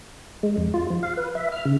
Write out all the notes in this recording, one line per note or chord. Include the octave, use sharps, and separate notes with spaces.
G#3
F2
F4
F3
F5
B4
E5
F6
C#3